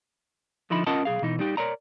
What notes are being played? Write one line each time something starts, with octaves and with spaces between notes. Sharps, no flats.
D3 F3 D#4 E4 B5
C#4 F4 A#4 D#5 F#5 A5
B1 G#4 F5
B2 E3 D#4
G3 D#4 G4
A#4 C#5 D5 A#5